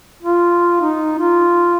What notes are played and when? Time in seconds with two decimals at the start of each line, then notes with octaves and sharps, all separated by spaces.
0.23 F4
0.81 D#4
1.19 F4